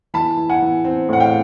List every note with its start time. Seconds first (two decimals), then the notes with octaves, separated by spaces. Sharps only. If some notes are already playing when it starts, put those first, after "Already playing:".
0.14 E3 A5 B5
0.37 E3
0.49 F#5 G#5
0.62 E3
0.85 C4
1.09 A2 F#5
1.20 F5 G5